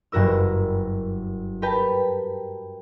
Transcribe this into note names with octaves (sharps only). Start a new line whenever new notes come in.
F#1 G2 F#4 A#4 E6
G4 A#4 B4 G5 A5